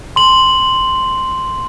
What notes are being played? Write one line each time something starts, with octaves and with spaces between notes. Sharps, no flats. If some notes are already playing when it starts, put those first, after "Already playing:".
C6 F#7